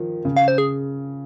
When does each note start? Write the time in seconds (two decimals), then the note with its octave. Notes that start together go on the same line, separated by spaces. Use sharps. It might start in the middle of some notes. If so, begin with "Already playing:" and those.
Already playing: D#3 F3
0.25 C#3
0.37 F5
0.48 C5
0.58 G#4